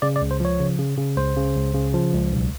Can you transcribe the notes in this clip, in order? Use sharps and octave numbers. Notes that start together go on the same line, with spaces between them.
C#3 D5
D5
C#2
C5
F3 C#5
C#3
C#3
C#3
C#2 C5
C#3
C#2
C#3
F3
C#2
B1